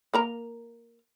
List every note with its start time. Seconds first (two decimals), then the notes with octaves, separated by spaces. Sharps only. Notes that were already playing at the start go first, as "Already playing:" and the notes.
0.14 A#3 A#4 A#5